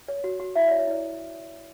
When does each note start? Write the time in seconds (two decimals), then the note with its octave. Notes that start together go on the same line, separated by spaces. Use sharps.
0.08 C#5
0.24 F#4
0.40 F#4
0.56 E4 E5
0.68 C#5 D5
0.79 C#5
0.87 E4 D5